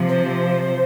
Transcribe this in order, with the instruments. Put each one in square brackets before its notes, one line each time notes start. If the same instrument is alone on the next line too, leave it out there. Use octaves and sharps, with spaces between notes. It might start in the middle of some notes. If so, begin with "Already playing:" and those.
Already playing: [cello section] C3 F3
[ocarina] C5